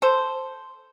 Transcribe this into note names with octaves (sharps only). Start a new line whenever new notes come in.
A4 C5